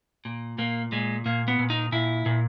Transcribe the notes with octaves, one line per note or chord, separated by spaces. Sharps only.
A#2
A#2 A#3
A#2 G#3
A#2 A#3
B3
A#2
D#4
A#2 E4
A#2